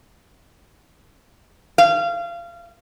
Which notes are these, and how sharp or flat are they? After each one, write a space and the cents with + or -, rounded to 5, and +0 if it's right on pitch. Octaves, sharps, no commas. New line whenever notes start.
F5 -25